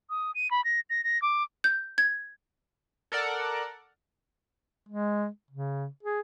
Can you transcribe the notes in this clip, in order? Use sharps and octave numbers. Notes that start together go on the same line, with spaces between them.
D#6
D#7
B5
A#6
A#6
A#6
D6
G6
G#6
A4 A#4 D5 F#5
G#3
C#3
G#4